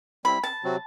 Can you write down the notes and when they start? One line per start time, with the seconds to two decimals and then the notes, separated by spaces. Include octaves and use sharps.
0.25 G3 C4 E4 B5
0.43 A5
0.64 C3 F#3 C4 F#4